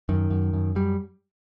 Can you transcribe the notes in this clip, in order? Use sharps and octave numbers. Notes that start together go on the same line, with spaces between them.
F#2 D#3
F#2
F#2
F#2 G3